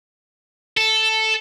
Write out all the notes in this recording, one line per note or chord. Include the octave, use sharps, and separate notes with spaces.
A4